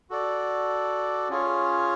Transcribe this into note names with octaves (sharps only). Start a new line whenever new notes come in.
F#4 A4 D5
C#4 F4 G#4 C#5